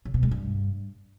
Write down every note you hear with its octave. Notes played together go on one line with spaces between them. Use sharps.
C#3
B2
G#3
G2